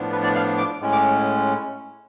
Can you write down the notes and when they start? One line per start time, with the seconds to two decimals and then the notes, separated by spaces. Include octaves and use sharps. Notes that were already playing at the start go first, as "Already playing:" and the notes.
Already playing: A2 F3 B3 D4
0.12 B4
0.23 D5
0.36 F5
0.58 D6
0.81 A2 G#3 C#4
0.92 D6